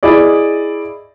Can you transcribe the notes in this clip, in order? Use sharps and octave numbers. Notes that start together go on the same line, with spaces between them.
E4 G#4 D5 D#5